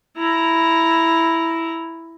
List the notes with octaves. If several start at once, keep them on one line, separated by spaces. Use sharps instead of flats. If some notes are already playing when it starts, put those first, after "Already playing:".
E4 A#5